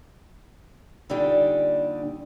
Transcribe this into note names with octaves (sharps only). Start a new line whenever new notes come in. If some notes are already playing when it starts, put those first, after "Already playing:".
A#2 D3 G3 D4 D#4 G4